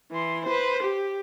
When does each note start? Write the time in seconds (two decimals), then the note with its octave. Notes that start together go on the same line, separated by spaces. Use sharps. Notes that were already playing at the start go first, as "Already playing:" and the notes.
0.11 E3 C6
0.45 B4 C5
0.82 G4